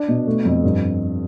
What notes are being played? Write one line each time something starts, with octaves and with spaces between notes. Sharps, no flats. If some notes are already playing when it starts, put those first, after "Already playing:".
Already playing: D4
B2
A3
F2
G2